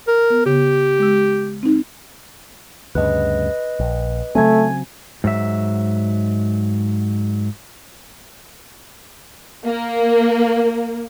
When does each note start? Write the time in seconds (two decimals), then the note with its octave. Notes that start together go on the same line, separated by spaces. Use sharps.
0.07 A#4
0.30 B3
0.46 C#3 B3 G4
0.99 G#3 E6
1.63 C4 D#4
2.95 D2 G2 C#3 B4 D#5
3.80 A#1
4.35 C#3 F#3 A3 C4 G#5 G#6
5.24 G#2 F#3 E5
9.66 A#3